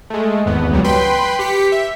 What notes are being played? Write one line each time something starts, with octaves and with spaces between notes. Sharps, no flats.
G#3 A3
G#1 E2 B3
C#2 F#3 G3
B4 G5 B5 C6
G4 B6 C#7
E5